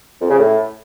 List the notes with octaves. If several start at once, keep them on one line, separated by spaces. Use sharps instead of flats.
F2
C#3
A2